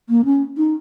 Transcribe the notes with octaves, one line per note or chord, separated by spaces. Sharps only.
A#3
C#4
D#4